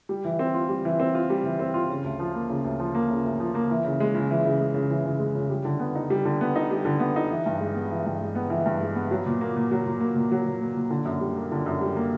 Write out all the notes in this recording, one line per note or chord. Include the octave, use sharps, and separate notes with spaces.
G3
E3
C4
F4
G3
E3
C4
F4
G3
E3
C4
F4
C#3
D2
F3
A#3
C#3
D2
F3
A#3
C#3
D2
F3
A#3
E3
C#3
G#3
C#3
E3
C#3
G#3
C#3
E3
C#3
G#3
C#3
G3
D3
B3
D#4
G3
D3
B3
D#4
G3
D3
B3
D#4
E3
G2
G#3
B3
E3
G2
G#3
B3
E3
G2
G#3
B3
F#3
A#2
A#3
A#2
F#3
A#2
A#3
A#2
F#3
A#2
A#3
A#2
D3
F#2
G3
A#3
D3
F#2
G3
A#3